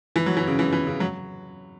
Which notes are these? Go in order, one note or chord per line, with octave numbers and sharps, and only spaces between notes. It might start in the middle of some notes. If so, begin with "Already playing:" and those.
E3
F#3
E3
C#3
E3
E3
C#3
F#3